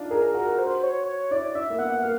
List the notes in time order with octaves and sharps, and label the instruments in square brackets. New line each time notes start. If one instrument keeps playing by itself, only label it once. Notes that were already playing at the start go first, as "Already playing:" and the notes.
Already playing: [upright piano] D4 D#4 F4
[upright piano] G#4 [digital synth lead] A#4
[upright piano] F#4 [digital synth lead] A#4
[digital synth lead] C5
C#5
C#5
[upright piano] E4 [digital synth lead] D5
[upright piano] E4 [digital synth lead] E5
[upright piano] A#3
[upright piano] B3 [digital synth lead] F#5
[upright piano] A#3 [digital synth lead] F5